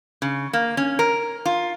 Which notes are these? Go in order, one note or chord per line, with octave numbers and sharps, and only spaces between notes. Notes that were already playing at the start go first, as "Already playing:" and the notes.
C#3
A#3
C#4
A#4
F4